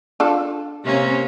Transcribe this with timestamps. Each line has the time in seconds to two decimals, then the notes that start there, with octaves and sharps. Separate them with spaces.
0.20 D4 F4 A4
0.84 C3 A#3 C#4